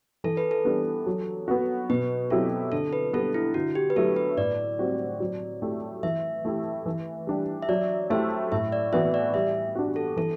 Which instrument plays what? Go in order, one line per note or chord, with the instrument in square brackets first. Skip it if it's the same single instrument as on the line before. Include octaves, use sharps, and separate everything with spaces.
[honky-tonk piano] E3 [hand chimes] A4
[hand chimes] B4
A4
[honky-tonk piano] G3 B3 D4
F#3
B3 F#4
[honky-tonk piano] B2 [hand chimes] B4
[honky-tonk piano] F#3 C4 E4 G4 [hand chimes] A4
[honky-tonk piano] D3 [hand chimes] A4
[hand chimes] B4
[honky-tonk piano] G3 B3 [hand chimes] A4
[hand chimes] E4
[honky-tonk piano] D3 [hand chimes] F#4
[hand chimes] G4
B4
[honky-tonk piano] F#3 A3 E4 G4 [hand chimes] A4
[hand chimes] B4
[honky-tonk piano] A2 [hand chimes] D5
[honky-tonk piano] G3 C4 F#4
F#3
A3 E4 G4
[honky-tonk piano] E3 [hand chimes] E5
[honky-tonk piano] A3 E4 G4
E3
G3 D4 G4
[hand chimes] E5
[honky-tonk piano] F#3 [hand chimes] D5
[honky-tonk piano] A3 E4 G4 [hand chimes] C5
[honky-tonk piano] A2 [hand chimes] E5
[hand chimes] D5
[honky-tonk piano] E3 B3 F#4 [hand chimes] E5
[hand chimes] D5
[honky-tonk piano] G3 [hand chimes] E5
[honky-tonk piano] D4 F#4
[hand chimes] A4
[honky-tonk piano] E3 [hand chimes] A4